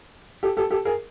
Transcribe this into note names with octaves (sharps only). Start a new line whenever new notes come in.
G4 A4
G4 A4
G4 A4
G#4 A#4